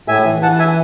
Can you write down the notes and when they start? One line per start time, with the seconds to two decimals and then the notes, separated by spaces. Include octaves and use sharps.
0.08 A2 E5 G#5
0.26 E3
0.41 E3 F#5 A5
0.59 E5 G#5